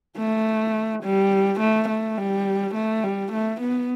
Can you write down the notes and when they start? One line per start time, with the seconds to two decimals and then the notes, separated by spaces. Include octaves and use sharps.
0.18 A3
1.04 G3
1.60 A3
1.89 A3
2.18 G3
2.75 A3
3.04 G3
3.32 A3
3.61 B3